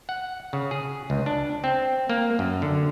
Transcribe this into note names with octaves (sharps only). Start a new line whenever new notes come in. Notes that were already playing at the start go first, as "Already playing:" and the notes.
F#5
C#3
G#4
C#2
D4
C4
A#3
F#2
D3